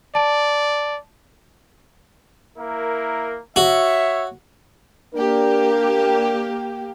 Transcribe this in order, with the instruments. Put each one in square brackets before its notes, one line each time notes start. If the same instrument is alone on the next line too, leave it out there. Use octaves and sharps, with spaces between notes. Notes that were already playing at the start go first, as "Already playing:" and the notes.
[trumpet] D5 [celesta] A5
[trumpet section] A#3 E4 A#4
[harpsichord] F#4 [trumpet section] C#5 E5
[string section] A#3 G4 [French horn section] D4 A#4